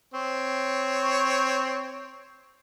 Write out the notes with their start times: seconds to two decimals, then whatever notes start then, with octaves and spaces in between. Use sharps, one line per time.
0.14 C4 C#5